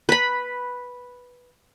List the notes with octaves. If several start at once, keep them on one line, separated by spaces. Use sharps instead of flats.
B4 B5